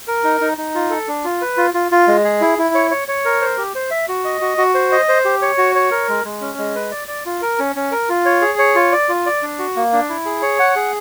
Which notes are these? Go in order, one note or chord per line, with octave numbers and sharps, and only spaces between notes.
A#4
D#4
D#4
D#4
F4
A4
D4
F4
B4
F4
F4
F4
G#3
G#4
E4
E4
C#5
C#5
C#5
A#4
C5
G4
C5
E5
F#4
D#5
F#4
F#4
C5
D#5
C5
G4
C#5
F#4
C#5
A#4
G#3
G#3
C#4
G#3
B4
D5
D5
F4
A#4
C#4
C#4
A#4
F4
C#5
G#4
C#5
F4
D5
F4
D5
D4
F#4
A#3
D4
E4
G#4
C#5
F#5
G#4